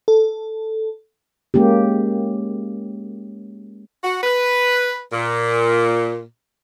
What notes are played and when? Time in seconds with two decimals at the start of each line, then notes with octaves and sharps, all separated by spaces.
0.08 A4
1.54 G#3 A#3 C#4 G4
4.04 F#4
4.23 B4
5.12 A#2